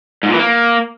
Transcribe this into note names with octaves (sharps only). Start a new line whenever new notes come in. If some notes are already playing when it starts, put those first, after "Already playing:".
G#2
A#2
E3
A#3